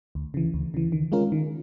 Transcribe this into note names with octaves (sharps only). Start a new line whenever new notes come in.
D2
C#3 E3
D2
C#3 E3
D#3
G#3 C#4 F4 A#4
D#3